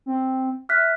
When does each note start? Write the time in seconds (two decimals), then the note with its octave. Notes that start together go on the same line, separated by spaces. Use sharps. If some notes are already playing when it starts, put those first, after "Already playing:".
0.06 C4
0.69 E5 F6 F#6 B6